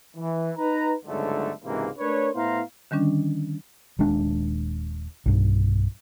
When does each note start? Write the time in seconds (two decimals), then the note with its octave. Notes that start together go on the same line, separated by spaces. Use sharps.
0.16 E3
0.58 D#4 B4 A#5
1.06 G1 C#2 G#2 D3 F#3 A3
1.64 C#2 G#2 C3 E3 A#3
1.99 A3 D4 A#4 B4 C#5
2.34 A2 B3 E4 C5 F5 A#5
2.91 D3 D#3 G3 C#4 D4
3.99 D#1 D#2 G#3 D4
5.26 B1 G2